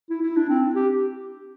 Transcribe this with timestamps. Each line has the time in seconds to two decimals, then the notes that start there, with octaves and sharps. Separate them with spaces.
0.10 E4
0.22 E4
0.36 D4
0.49 C4
0.75 G4